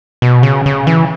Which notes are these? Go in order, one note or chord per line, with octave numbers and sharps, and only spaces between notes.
B2
C#3
C#3
E3